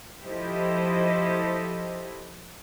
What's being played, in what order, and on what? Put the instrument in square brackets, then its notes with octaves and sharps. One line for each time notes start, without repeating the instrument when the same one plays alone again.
[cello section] F3 E4 G4 A4 C5 D#5